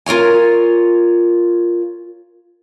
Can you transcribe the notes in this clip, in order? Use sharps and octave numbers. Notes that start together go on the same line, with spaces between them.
F4 A#4 C#5 G#5